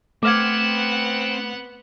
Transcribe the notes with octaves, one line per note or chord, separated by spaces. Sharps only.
A3 B3 C4 F#5 D6 F6 G#6